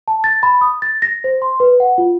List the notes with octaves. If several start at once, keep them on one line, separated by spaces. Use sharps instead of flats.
A5
A6
B5
D#6
A6
A#6
C5
C6
B4
F#5
F4